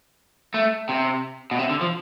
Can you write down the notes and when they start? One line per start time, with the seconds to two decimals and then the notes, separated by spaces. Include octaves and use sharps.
0.54 A3
0.89 C3
1.51 B2
1.59 C3
1.70 D3
1.81 F3